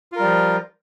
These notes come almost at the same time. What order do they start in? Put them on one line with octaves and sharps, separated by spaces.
F4 A#4 G3 F3